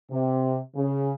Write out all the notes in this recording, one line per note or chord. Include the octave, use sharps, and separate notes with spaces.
C3
C#3